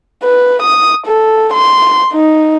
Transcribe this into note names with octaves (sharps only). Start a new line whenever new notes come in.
B4
D#6
A4
C6
D#4